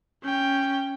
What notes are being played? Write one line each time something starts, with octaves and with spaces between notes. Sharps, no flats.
C#4 G5